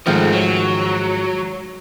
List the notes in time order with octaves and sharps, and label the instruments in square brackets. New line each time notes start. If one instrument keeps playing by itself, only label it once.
[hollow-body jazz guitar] G#2 D#3 F3 [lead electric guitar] A3 C4
[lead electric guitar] F#3